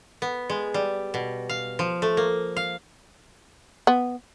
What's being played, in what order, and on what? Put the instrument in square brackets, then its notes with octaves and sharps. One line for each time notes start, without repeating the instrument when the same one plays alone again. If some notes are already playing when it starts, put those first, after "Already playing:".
[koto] B3
G#3
G3
B2
F5
F3
A3
A#3
F5
[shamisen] B3